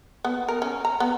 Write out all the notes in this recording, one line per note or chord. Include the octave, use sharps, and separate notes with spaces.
B3
A#4
C#4
A#5
B3